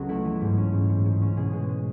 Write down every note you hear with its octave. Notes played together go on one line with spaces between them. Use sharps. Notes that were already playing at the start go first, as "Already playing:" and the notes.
Already playing: C#2 F#3 B3 F#4 A4
A3 E4
E3
G#2
C#4
G#2
G#2
G#2
C#4
B2 G#4
G#3
G#3